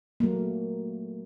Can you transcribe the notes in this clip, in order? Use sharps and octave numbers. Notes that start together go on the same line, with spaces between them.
F#3 A3 A#3